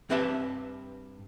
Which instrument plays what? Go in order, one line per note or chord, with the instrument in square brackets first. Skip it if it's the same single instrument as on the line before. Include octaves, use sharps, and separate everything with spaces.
[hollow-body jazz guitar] G2 C4 G4 B4 E5 A5